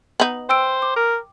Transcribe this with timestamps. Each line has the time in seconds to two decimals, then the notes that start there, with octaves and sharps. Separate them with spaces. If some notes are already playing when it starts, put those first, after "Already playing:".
0.20 B3 D#4 F#7
0.49 C5 G5 E6 D7
0.82 D6
0.96 A#4